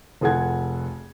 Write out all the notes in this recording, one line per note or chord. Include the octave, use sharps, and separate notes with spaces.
F1 F4 G#4 A4 F#5 G#6